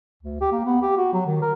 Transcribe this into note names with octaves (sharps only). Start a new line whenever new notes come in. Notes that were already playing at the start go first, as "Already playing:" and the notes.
D2
G4
A#3
B3
G4
F#4
F#3
D#3
A#4